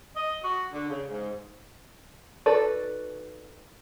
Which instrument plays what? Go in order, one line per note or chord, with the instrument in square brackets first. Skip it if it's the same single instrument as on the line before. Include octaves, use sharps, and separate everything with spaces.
[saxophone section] D#5
F#4
D3
C#3
G#2
[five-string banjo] D#4 F#4 A4 B4 D5